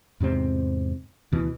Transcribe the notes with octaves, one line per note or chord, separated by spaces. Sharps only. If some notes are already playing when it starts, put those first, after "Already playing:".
E2 G#2 C3 C4
D2 B2 E3